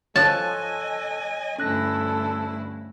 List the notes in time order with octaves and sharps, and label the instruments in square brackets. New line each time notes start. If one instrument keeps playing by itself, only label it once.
[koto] F3 A5 [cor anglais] A4 [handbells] C#5 F#6 [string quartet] D#5 G#5
[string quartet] D2 G2 E4 [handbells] C#4 F#6 A#6 [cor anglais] A4